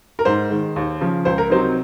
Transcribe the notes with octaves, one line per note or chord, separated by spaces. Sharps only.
A#4
G#2 C5
D#3 G#3
D#2
C#3 F3
C#2 C5
A#4
C3 F#3 C4 D#4 C5